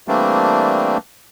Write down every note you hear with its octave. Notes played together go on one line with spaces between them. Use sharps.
E3 G3 A3 A#3 C4 D4